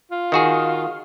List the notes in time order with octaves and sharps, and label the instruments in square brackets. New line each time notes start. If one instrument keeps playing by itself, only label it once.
[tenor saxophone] F4
[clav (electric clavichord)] D#3 F#4 G#4